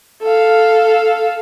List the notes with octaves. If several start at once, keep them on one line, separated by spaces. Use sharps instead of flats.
A4 F5